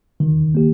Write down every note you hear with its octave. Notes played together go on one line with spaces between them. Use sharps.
D#3
A#3 G4